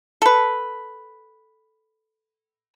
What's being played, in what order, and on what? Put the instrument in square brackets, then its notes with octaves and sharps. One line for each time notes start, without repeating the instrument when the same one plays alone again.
[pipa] A4 B4